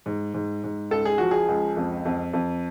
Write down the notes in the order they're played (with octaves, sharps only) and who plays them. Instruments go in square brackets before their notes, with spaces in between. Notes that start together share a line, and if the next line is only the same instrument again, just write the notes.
[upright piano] G#2
G#2
G#2
C#2 A4
G#4
F3 F#4
G#4
C#2
F2
F2
F2